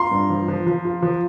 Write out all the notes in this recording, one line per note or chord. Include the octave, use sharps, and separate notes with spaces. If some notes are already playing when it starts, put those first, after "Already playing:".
Already playing: F4 A#5 C6
G2
F3
F3
F3
F4
F3